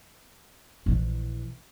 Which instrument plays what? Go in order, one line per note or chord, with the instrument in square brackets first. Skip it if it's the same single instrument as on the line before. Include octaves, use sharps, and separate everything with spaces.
[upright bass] A#1 E3